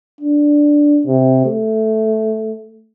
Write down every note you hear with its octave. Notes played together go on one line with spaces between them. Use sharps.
D4
C3
A3